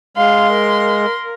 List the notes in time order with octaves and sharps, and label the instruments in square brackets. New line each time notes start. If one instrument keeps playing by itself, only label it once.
[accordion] G#3 [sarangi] F5 [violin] C6
[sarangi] A#4